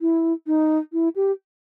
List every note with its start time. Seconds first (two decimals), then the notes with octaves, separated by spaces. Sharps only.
0.01 E4
0.47 D#4
0.93 E4
1.16 G4